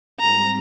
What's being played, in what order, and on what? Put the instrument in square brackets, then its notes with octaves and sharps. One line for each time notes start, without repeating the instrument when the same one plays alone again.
[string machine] G#2 G3 C4 G4 [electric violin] A#5